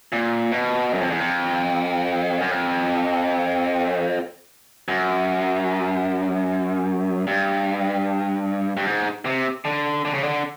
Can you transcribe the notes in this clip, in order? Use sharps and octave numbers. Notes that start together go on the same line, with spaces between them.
A#2
B2
F#2
F2
E2
F2
F#2
F2
F#2
G2
G2
G#2
C3
D3
D3
C#3
D3